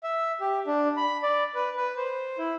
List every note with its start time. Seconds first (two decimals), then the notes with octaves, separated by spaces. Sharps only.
0.03 E5
0.41 G4
0.67 D4
0.97 B5
1.23 D5
1.55 B4
1.77 B4
1.96 C5
2.38 E4